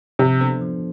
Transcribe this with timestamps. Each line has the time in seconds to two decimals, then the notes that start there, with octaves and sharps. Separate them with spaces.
0.19 C3 F3
0.41 B3 D4 A4 C5
0.61 F3